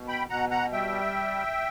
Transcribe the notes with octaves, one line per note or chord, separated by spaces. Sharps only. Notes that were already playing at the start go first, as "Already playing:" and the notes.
Already playing: B2
G5 B5
B2 F#5 A#5
F#5 A#5
G3 E5 G5